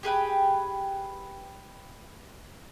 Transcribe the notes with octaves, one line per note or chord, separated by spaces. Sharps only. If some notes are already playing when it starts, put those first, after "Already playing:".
G4 G#4 B4 G5